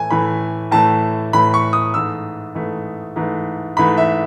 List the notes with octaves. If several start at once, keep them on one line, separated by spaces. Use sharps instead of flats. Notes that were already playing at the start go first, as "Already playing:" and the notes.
Already playing: A2 E3 A3 G#5
A2 E3 A3 B5
A2 E3 A3 A5
A2 E3 A3 B5
C#6
D#6
G#2 E3 A3 E6
G#2 E3 A3
G#2 E3 A3
G#2 E3 A3 B5
E5